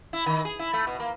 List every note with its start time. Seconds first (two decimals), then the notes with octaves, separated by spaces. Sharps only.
0.13 E4
0.26 D#3
0.45 G#4
0.59 E4
0.74 A3
0.87 B2
1.00 A#3